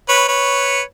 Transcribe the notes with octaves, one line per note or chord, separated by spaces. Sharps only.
B4 C#5
B4 C#5